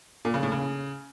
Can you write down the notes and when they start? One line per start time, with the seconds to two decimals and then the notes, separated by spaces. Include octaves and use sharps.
0.25 A#2
0.34 C#3
0.43 A2
0.52 C#3